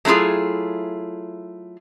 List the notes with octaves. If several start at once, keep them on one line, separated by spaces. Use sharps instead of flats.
F#3 A3 E4 F4 G#4